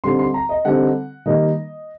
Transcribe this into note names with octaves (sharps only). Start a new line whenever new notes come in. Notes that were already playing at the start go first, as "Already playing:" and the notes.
D3 G3 C4 D#4 C6
C6
A#5
D#5
D3 G3 C4 D#4 F#5
D#3 G3 A#3 D#4 D#5